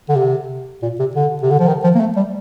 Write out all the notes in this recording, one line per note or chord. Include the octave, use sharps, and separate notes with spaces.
D3
C3
A#2
C3
D3
C3
D3
F3
D#3
F3
A#3
A3
G3